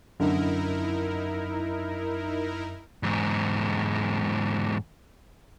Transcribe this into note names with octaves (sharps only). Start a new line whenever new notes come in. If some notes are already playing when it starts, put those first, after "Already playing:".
F#2 D3 D#4 E4 A#4
E2 G#2